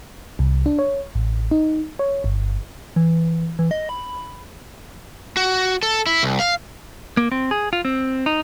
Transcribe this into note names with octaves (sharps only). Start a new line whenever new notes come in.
C2
D4
C#5
A1
D#4
C#5
G1
E3
E3
D#5
B5
F#4
A4
E4
C2
F5
A#3
C4
G#4
F4
C4
D#4